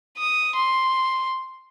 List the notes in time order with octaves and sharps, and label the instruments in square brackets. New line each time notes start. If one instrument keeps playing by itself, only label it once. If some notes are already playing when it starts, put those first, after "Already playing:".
[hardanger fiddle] D#6
C6